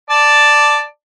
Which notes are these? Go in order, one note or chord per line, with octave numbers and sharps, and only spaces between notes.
D5 A5